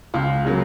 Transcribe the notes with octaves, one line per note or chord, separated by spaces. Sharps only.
C#2 F4
C#3 F#3 A#3